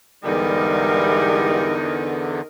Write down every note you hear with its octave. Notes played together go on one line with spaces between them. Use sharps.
E2 G#2 D3 E3 G3 D#4 A#4